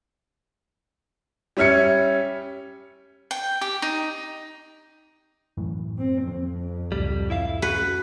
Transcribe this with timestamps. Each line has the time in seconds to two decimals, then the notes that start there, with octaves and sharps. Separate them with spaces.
1.57 G3 C#4 E5 F6 G#6 C#7
3.31 G5
3.61 G4
3.82 D#4
5.58 F#2 A2 E3
5.98 C4
6.27 F2 F3
6.92 C#2 F#2 A2 G3
7.30 E4 E5 F5
7.62 F#4 B4